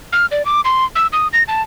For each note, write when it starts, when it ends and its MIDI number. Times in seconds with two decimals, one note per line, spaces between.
0.13 0.26 89
0.31 0.45 74
0.45 0.61 86
0.65 0.84 84
0.96 1.07 88
1.13 1.28 87
1.33 1.43 94
1.48 1.62 81